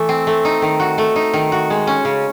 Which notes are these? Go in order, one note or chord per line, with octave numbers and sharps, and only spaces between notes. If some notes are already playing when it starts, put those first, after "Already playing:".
Already playing: E3 A3
C4
A3
D#4
D#3
F#4
A3
D#4
D#3
F#4
G#3
C#4
C#3